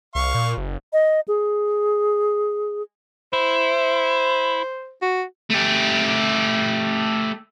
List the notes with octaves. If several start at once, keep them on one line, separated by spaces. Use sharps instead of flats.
C2 F5 C#6
A#2
F#1
D#5
G#4
E4 C5
F#4
A3 G4